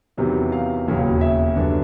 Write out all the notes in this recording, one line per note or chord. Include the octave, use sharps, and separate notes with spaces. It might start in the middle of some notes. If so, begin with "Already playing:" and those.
E2 C3 D#3 F#3
F5
E1 D#2 C#3 F#3
E5
F#2 D3 G3 B3 D4